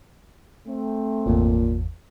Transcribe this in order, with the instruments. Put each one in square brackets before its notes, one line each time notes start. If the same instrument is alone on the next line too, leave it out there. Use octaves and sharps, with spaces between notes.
[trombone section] A3 C4
[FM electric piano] G#1 E2 [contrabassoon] A#2